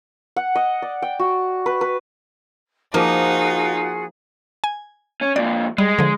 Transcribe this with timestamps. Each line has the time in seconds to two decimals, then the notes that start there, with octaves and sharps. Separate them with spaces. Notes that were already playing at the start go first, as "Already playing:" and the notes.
0.36 F#5
0.56 D#5
0.82 D5
1.02 G5
1.19 F#4
1.66 B4
1.81 B4
2.94 F3 A#3 D#4 F4 F#4 G#4
4.64 G#5
5.21 C#4
5.36 F2 A#2 D5
5.78 G3 G#3
5.99 D3 F3